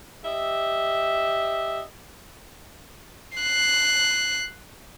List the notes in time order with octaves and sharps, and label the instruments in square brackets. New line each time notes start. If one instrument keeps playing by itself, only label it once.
[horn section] G4 D#5 E5
[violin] F#6 C7